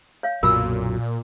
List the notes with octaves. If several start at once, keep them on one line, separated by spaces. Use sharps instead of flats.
C#5 F5
B1 F#2 A#2 F#3 A#4 B5 E6